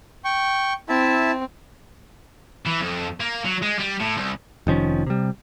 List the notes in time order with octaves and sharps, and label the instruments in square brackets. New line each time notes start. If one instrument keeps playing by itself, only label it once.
[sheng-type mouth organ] G5 C#6
[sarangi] C4 [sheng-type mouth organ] E4 E5 A5
[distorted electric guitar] E3
F2
A#3
F#3
G#3
G3
A2
C2
[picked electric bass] F1 D#3 F3 C#4
C3 G3